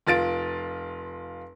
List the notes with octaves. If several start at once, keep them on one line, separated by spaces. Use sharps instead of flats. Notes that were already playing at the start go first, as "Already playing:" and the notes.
F1 F4 A6 D7